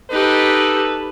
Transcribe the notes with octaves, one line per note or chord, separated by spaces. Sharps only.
D#4 G4 A4 B4